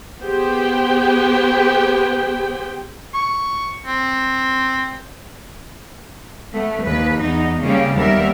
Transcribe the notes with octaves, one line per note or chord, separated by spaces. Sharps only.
B3 G4 G#4 C5 G5
C#6
C4
A3 B3
D#2 B4
E2 B3 D#4
C#3 G3 A#3 C#4
D#2 G3 B3 A#4 E5